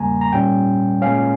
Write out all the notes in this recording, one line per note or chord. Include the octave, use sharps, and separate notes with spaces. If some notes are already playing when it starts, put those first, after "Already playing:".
Already playing: E2 C#3 G3 A#3 G#5 A#5
A#5
A#2 G3 C#4 G5
A#2 G#3 C#4 F5